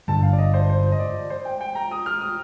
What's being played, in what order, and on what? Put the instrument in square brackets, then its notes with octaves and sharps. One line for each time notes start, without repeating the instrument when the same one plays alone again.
[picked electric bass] G2 D3 G3 [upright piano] A5
[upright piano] F5
D5
D#5
C5
C5
D#5
D5
C5
G5
G5
A#5
D#6
F6
D#6